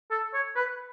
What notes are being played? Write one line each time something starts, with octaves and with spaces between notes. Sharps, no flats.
A4
C#5
B4